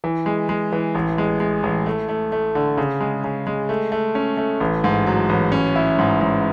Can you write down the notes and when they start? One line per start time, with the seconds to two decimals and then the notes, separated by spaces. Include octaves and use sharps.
0.04 E3
0.26 G#3
0.49 G#3
0.72 E3
0.95 A1
1.18 G#3
1.40 G#3
1.63 A1
1.86 A3
2.09 A3
2.32 A3
2.55 D3
2.77 C#3
3.00 G#3
3.24 C#3
3.47 G#3
3.69 A3
3.92 A3
4.15 C#4
4.37 A3
4.60 A1
4.84 G#2
5.06 F#3
5.29 A1
5.52 C#4
5.76 E4
5.99 G#2
6.21 G#2